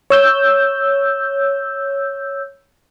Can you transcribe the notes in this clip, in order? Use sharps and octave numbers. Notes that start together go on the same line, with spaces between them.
C#5 E6 G6